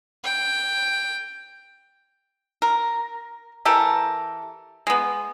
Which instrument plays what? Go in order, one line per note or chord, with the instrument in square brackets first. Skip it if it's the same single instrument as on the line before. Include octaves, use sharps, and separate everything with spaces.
[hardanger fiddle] G5
[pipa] A#4
E3 G4 A4 A#4
G#3 B3